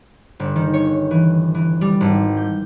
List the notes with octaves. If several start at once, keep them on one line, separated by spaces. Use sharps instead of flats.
G1
D#3
C#5
E3
E3
G3
G#1
G6